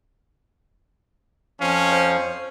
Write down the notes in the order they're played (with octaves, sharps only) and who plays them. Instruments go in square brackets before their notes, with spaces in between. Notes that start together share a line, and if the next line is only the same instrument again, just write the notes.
[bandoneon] F2 F3 F5 [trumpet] C#4
[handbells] C5